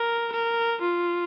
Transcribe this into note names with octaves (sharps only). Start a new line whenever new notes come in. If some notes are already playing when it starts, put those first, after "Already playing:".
Already playing: A#4
A#4
F4